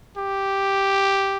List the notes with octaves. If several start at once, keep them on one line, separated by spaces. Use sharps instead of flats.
G4